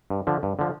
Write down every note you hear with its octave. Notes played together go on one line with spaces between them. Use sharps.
G2
D3 F3
G2
D3 F3